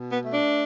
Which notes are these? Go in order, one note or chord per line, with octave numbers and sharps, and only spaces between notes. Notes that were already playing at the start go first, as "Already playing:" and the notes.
Already playing: B2
B3
A3
D4